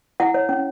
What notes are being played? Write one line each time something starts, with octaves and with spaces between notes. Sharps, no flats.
E4 F#5
C#5
C#4